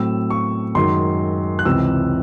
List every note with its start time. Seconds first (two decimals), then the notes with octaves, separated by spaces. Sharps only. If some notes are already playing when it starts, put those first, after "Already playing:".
Already playing: A2 F#3 C4 E6
0.30 C#6
0.75 F#2 D#3 G#3 C6
1.59 F#6
1.65 C#2 C3 E3 C4 E6